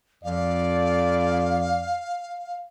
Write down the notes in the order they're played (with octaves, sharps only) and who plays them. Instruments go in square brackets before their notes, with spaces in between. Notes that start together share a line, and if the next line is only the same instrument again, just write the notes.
[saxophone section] F2 [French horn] D5 [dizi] F5